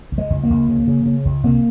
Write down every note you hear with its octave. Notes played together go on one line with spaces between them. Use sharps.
C#2
G#3
C#2
A#3
C#2
C#3
C#3
C#3
C#2
C3 A#3